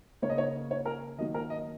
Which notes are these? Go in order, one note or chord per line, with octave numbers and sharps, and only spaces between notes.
C#3 A#3 C#4 C#5
D#5
C#5
C#5
A#4
D#3 F#3 A#3 D#5
A#4
D#5